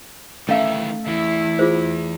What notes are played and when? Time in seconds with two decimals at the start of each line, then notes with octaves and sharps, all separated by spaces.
0.49 D#3 E3 A3 C#4 E5 F5
1.07 E2 E3 E4
1.59 F4 G#4 C5